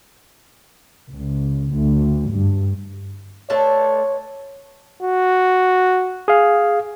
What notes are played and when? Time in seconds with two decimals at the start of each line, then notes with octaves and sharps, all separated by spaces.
1.11 C#2
1.74 D2
2.31 G2
3.50 A3 D4 A4 C#5
5.03 F#4
6.28 G#4 F5